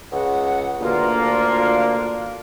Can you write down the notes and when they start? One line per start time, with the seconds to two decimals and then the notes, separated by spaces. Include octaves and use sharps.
0.12 C#2 F#5
0.81 D2 G2 A#3 F4
1.21 D4